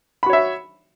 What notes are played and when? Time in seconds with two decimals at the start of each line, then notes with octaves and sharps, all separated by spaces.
0.23 B5
0.26 F#4
0.30 C#5
0.33 E5